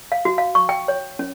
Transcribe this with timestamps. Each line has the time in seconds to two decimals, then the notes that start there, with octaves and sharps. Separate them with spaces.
0.12 F5
0.25 F#4
0.38 F5
0.55 C#6
0.69 G5
0.88 C#5
1.19 C#4